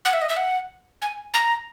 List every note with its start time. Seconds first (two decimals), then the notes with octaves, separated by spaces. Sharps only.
0.05 F#5
0.13 E5
0.22 D#5
0.29 E5
0.37 F#5
1.02 G#5
1.34 A#5